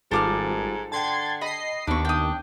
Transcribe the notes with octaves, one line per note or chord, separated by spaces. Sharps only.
G#1 G#2 G3 F4 G4 A4 D6 F6
D3 G5 A5 C6 G#6 A6
D#5 B5 C7
D#2 B3 D4 D#4 B5 C#6
G5 D#6